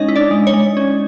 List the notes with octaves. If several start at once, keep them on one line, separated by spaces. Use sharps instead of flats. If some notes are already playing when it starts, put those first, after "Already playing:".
Already playing: G#3 C#4 D#4 C#5 D#5
E4
D4 D5
G#3
C#5
G#3
C#4